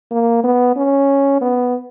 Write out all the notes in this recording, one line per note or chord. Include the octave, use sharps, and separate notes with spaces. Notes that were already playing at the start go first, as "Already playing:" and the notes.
A#3
B3
C#4
B3